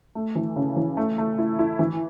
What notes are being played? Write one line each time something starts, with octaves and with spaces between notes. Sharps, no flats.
A3
E3
C#3
E3
A3
A3
E4
E4
E3